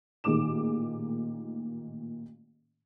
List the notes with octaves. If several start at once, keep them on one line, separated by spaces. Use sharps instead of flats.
A1 A#2 D#3 G#4 D6 E7